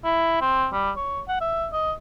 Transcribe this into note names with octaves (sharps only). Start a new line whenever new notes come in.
E4
C4
G3
C#5
F#5
E5
D#5